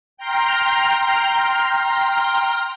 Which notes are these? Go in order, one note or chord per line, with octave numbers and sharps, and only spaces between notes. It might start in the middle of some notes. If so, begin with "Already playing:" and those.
G5 A#5 C6 F6